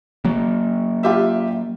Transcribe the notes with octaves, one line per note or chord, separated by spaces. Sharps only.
F#3 A#3
F4 G4 E5